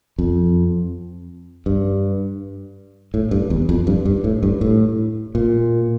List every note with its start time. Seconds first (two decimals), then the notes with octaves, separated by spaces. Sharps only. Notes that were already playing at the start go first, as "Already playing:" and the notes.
0.19 F2
1.66 G2
3.14 A2
3.31 G2
3.50 E2
3.69 F2
3.87 G2
4.06 G2
4.24 A2
4.43 G2
4.61 A2
5.35 A#2